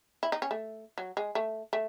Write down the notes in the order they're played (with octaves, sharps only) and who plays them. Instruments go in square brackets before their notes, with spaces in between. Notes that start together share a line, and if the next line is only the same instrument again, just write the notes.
[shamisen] E4
D#4
C#4
A3
F#3
G#3
A3
A3